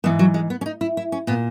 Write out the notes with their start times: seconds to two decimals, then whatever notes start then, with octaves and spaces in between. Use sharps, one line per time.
0.04 G#2 E3 B3
0.19 F#3
0.34 G#3
0.50 B3
0.61 C#4
0.66 D#4
0.81 E4
0.97 E4
1.12 C#4
1.27 A#2 B3